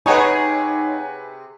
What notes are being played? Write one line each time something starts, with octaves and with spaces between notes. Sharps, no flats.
C3 D#4 G#4 B4 C#5 F#5 G#5